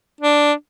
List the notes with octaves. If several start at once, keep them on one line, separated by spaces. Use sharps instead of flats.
D4